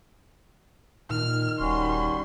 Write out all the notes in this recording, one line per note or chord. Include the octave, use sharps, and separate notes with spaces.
A#2 D#3 F6
D#1 G3 C#4 F#4 C6